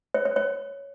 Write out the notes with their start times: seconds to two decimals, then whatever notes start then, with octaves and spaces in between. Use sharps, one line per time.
0.14 C#5
0.25 C#5
0.36 C#5